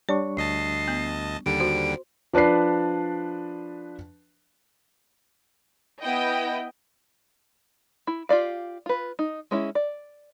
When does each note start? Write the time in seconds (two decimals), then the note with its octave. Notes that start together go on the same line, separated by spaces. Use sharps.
0.09 G3 D4 C#5 C#6
0.37 D2 D#5 A5 C7
0.88 B3
1.46 D#2 D3 G3 D7
1.60 F#4 C5
2.33 F3 D4 B4 D5 C7
6.02 B3 E4 D#5 G5
8.07 E4
8.29 F4 G4 D5 F5
8.86 F4 B4
9.19 D#4
9.51 G#3 C#4 E4
9.75 D5